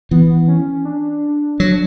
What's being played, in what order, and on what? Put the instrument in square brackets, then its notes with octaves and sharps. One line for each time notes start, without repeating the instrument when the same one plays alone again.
[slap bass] E3 [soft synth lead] B3
[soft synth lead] C#4
D4
[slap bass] F#3